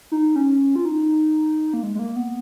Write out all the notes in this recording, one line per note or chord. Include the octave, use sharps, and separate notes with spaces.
D#4
C#4
F4
D#4
A#3
G#3
G#3
A#3
B3